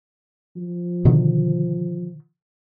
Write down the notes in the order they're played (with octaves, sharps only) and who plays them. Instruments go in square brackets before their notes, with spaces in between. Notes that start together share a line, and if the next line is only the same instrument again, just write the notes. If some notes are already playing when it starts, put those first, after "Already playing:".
[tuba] F3
[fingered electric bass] B2 D3 D#3